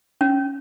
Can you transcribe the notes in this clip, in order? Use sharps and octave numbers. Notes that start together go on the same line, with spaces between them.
C#4